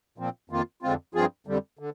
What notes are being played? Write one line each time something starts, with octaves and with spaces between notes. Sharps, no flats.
A#2 F3 C4
F2 D#3 A#3 F4
F2 D3 G#3 C4 F4
G2 F3 C4 F4 G#4
F2 D3 G3
D3